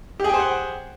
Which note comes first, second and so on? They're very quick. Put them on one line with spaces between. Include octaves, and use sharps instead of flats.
G4 G#4 G5 C5 F#5